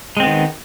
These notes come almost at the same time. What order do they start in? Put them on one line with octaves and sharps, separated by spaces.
G#3 C4 B3 D#3